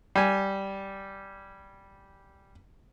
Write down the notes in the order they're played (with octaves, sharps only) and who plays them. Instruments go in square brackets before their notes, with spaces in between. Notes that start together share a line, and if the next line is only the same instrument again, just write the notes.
[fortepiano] G3 G#5